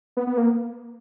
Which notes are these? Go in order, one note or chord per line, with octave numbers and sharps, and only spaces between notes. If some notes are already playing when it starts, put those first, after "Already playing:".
B3
B3
A#3